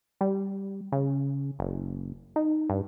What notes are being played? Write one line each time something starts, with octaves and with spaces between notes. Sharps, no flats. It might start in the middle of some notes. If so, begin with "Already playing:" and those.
G3
C#3
F#1
D#4
G2